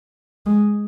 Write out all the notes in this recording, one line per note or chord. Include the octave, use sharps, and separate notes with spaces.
G#3